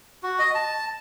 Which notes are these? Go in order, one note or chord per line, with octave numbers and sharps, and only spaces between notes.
F#4
D#5
A5